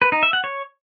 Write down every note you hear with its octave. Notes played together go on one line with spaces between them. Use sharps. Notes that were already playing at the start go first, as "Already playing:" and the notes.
B4
D#4
E5
F#5
C#5